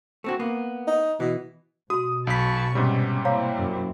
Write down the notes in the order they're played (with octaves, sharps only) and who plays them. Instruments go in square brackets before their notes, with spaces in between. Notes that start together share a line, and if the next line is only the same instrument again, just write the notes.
[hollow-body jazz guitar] A3 C4 F#4
A#3 B3
[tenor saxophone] D#4
[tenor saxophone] B2 [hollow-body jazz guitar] E3
[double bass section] B2 [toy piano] F#4 C6 [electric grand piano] D#6
[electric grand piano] B1 B6 [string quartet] A5 B5 C#6
[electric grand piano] G#2 C3 G3 [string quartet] B3 C#4
[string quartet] A#3 C4 E4 [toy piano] C#5 F5 A#5
[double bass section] F#2